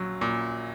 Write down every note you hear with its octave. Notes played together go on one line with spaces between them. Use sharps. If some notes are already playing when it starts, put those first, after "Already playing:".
Already playing: A#1 F#3
A#2